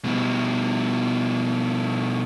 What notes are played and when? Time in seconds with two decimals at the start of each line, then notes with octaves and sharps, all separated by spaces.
0.04 B2 G3